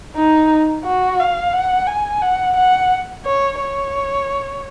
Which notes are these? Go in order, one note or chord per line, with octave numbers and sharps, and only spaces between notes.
D#4
F#4
F5
F#5
G#5
F#5
F#5
C#5
C#5